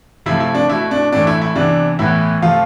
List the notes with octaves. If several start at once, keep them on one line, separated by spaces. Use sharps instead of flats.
C3 F3 A3 E4
E4
D4
B2 A3 E4
D4
A2 E3 A3 D4
E4
E4
C3 E3 B3 D4
A2 E3 B3 E4
C3 F3 A3 F4